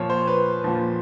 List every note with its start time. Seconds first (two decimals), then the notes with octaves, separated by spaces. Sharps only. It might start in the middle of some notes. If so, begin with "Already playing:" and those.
Already playing: A#2 F3 C#5
0.10 C5
0.27 B4
0.64 A#2 F3